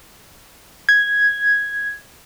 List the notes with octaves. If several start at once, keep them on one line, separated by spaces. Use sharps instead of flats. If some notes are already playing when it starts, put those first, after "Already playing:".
G#6